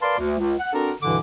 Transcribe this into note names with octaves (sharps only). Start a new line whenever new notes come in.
A#4 B4 D5 F5 A5 C6
D2
C#2
F#5
C4 D4 F#4 A4 A#4
C2 G2 B2 D3 E3 D6